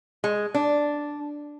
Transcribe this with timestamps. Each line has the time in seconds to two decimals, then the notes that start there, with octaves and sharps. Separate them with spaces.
0.24 G#3
0.54 D4